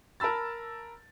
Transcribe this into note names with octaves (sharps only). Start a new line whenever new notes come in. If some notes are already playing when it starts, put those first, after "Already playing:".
A#4 A5 B5 E6 A6